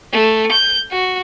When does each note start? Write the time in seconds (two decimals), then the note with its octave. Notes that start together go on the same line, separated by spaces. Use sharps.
0.12 A3
0.51 G6
0.91 F#4